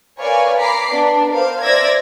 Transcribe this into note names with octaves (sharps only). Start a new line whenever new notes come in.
A#4 B4 C#5 D5 F5 G#5
A#5 B5 D6 C7
B3 D4 D5
A#4 C5 F5
C5 D5 E5 E6 G#6 A#6